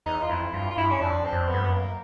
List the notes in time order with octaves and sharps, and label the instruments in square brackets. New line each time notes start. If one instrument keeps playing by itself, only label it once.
[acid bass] E2 [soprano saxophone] D#4
[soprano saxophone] F4
[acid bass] F2 [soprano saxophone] E4
[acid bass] G2 [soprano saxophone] F4
[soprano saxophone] F4
[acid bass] G2 [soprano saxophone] E4
[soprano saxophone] C#4
[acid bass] F2 [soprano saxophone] D4
[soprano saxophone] C4
[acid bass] F2
[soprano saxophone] B3
[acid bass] G2
[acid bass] F#2 [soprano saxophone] B3
[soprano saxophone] A#3